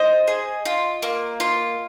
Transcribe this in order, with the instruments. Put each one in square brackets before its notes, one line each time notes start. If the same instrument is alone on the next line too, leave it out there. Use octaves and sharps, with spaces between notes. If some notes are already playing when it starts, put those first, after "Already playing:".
Already playing: [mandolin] C5 [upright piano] D#5
[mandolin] G#4
F4
A#3
F4